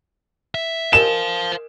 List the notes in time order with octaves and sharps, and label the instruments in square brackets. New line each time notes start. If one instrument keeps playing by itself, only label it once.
[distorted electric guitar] E5
[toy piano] A#4 D#5 G#5 [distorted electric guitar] C5 F5 [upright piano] E7